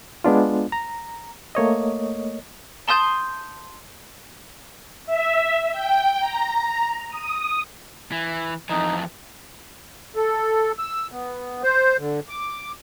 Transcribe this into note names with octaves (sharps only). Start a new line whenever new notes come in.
G#3 B3 D4 F4
A#5
A3 A#3 C#5 D#5
A5 C6 D#6 G6
E5
G5
A#5
D#6
E3
F2 E3 D#4
A4
E6
B3
C5
D3
D6